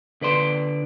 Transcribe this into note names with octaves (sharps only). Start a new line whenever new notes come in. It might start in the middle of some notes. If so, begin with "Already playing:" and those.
D3 B4 D5 C6